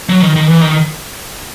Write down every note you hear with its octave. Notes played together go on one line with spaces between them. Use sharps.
F#3
D#3
D#3
E3
D#3